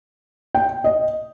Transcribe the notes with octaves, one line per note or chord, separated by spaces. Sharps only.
G5
D#5